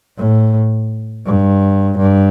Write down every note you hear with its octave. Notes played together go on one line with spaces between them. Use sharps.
A2
G2
G2